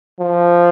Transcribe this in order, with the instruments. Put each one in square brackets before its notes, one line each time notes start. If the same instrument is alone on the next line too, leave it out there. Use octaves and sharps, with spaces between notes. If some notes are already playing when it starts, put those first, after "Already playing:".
[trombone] F3